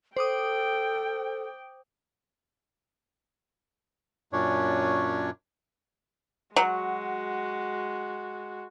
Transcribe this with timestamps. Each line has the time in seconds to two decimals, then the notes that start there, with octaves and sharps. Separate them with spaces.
0.17 A4 C5 G5 D6 D#6
4.33 F#2 A#2 C#4 D4 C#5
6.56 F#3 G#3 F#4